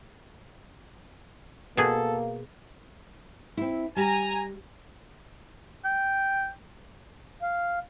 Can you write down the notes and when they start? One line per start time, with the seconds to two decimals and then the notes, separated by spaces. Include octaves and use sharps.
1.77 B2 A#3 G#4 A4
3.57 C4 E4
3.96 G3 G#5 A#5
5.85 G5
7.42 F5